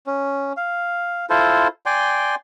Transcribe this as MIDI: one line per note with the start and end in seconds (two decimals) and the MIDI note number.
0.07 0.53 61
0.57 1.26 77
1.30 1.68 64
1.30 1.68 65
1.30 1.68 69
1.30 1.68 72
1.86 2.35 74
1.86 2.35 79
1.86 2.35 80
1.86 2.35 84